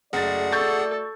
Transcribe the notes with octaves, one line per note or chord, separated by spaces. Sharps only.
F#1 A3 F#4 G#4 D5 F#5 A6
A4 C#6 G6 A6